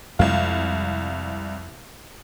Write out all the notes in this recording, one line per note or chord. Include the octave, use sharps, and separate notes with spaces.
C2 F2 G#3 F5